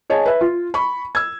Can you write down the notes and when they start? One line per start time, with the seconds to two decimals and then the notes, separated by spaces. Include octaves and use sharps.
0.10 G#4 C#5 D#5 G#5 A5
0.26 B4 E5
0.41 F4
0.74 B5 C#6
1.15 E6 G#6